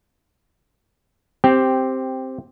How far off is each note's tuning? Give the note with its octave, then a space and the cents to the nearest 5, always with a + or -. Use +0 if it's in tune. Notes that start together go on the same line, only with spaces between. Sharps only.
C4 +0 G4 +0